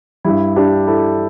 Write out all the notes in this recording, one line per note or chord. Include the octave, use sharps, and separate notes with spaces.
G2 G3 E4
D4 G4
E4 A4